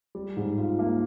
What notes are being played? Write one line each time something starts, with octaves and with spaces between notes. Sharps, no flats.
G3
G#2
F4
A#3